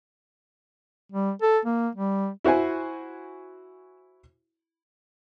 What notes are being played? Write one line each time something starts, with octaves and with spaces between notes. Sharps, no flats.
G3
A4
A#3
G3
E4 F#4 C5 G#5